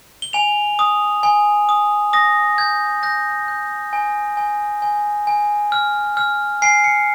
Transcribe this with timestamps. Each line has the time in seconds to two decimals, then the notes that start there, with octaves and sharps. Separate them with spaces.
0.22 G7
0.33 G#5 F7
0.79 D#6
1.23 G#5
1.69 D#6
2.13 D#6 A#6
2.58 G6 G#6
3.03 G6 A#6
3.48 G6
3.93 G#5
4.37 G#5
4.82 G#5
5.27 G#5
5.72 F6
6.17 F6
6.62 G#5 C7
6.84 C#7